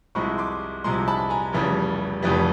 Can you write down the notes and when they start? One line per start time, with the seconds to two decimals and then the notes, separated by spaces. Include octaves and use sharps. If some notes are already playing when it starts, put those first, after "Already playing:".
0.15 C2 C3 F3 G#3 B5 C#6
0.38 C6 D6
0.84 C2 C3 F3 G#3 A#5 C6
1.08 A5 B5
1.30 G#5 A#5
1.53 F1 F2 C#3 E3 G3
2.22 F1 F2 C#3 E3 G3